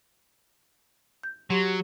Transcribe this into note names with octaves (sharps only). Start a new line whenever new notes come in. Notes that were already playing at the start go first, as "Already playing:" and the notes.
G6
F#3 G4 C6